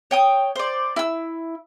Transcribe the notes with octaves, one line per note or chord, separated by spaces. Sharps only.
C#5 G5 D#6
C5 D5
E4 E6